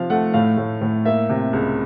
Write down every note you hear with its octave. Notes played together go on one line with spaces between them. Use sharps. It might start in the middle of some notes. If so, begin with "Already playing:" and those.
Already playing: C3 F3 F5
A3 F#5
A2 F5
A2
A2
A#3 E5
C3
C#2